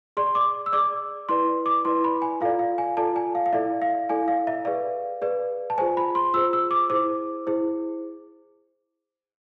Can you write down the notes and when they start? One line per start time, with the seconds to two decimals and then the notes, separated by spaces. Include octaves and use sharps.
0.17 G#4 D5 C6
0.35 D6
0.66 E6
0.73 G#4 D5 D6
1.29 E4 B4 D5 C6
1.66 D6
1.85 E4 B4 D5 C6
2.04 B5
2.22 G#5
2.41 F4 A4 D5 F5
2.59 F5
2.78 G#5
2.97 F4 A4 D5 A5
3.16 G#5
3.35 F5
3.46 F5
3.53 E4 A4 D5 E5
3.82 F5
4.09 E4 A4 D5 G#5
4.28 F5
4.47 E5
4.65 G#4 B4 D5 F5
5.22 G#4 B4 D5
5.70 A5
5.78 F4 G#4 C5 G#5
5.97 B5
6.15 C6
6.33 F4 G#4 C5 E6
6.53 E6
6.71 D6
6.90 E4 G#4 C5 D6
7.47 E4 G#4 C5